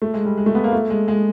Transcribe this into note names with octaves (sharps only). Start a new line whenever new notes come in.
A3
G#3
G3
G#3
A3
B3
A#3
A3
G#3
G#3